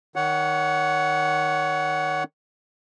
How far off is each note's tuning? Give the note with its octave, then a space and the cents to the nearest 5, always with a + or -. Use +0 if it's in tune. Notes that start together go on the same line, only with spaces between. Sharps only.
D#3 +0 C#5 +25 F#5 +0